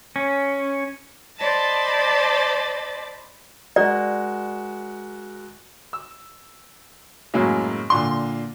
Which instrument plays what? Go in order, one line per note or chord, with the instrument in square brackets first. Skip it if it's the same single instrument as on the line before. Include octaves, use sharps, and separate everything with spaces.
[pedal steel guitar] C#4
[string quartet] C5 D5 D#5 A5 B5 A6
[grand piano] G#3 F#4 A#4 [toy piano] D5
[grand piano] E6
F#2 A2 C#3 F#3 G#3 A#3
A#2 D3 C6